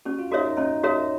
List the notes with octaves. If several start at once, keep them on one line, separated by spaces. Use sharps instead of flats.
C#4 F#4
F4
D#4 F#4 A#4 C#5 E5
D#4
C#4 D#4
F#4 A#4 C#5 E5